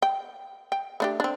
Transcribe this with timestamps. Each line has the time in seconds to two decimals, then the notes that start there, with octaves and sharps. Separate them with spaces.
0.02 G5
0.72 G5
1.00 A3 D4 G4
1.20 C4 D4